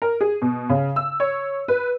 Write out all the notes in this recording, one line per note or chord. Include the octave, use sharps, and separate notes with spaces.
A#4
G#4
B2
C#3
E6
C#5
B4